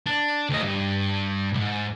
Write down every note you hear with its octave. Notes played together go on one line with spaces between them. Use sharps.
D4
D2 D#5
G2
C2 G#2